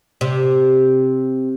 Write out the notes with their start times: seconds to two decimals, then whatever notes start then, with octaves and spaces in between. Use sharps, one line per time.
0.21 C3